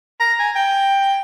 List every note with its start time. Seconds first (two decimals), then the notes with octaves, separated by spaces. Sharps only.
0.20 A#5
0.39 G#5
0.56 G5